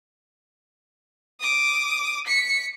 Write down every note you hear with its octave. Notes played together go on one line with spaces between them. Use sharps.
D6 D#6
B6 C#7